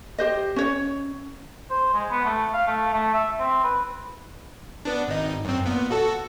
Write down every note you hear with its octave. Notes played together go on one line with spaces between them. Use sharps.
G4 C5 D#5
C#4 C#5
C5
G#3
B3
A3
F5
A3
A3
E5
C4
B4
B3 D4
G#1 D#4
F#2 C4
A#2 B3
F#4 A4